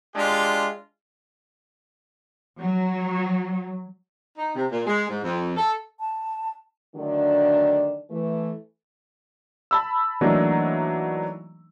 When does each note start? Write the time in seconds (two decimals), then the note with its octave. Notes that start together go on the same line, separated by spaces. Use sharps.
0.15 G#3 D4 F4 G4
2.59 F#3
4.37 D#4
4.55 C3
4.70 A#2
4.87 G#3
5.08 G#2
5.23 F2
5.57 A4
6.00 A5
6.95 D3 D#3 F#3 A3 D4
8.10 E3 A3
9.71 A5 B5 E6
10.21 E3 F#3 A3 A#3 D4 D#4